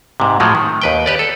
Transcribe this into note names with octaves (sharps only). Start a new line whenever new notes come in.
G#2 C3
A2 F3 F#3 G#3
D#3
D#2 B4 G5
G4 B4 D5
A4